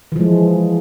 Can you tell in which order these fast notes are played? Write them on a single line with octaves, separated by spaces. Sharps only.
E3 F3 G#3